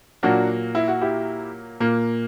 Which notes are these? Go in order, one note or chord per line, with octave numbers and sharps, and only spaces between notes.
A#2 F#3 A#3 D4 F#4
E4
F#4
E4 G4
A#2 A#3